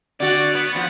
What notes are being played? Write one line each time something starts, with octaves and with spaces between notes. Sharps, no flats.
D3 F#4 D5
B3
E2 F3 F#5